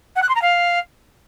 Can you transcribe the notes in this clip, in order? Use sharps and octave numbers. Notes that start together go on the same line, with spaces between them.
F#5
F#6
C6
A#5
F5